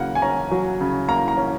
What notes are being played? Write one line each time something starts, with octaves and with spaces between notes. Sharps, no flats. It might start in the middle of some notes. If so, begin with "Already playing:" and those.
Already playing: C#3 F#3 A#3 F#5
G#5
C#4 A#5
F#3
C#3
A#3 A#5
A#5
C#4